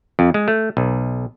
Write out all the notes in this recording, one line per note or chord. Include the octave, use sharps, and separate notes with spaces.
F2
G#3
A3
B1